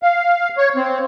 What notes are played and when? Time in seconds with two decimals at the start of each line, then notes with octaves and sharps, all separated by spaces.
0.03 F5
0.58 C#5
0.76 C4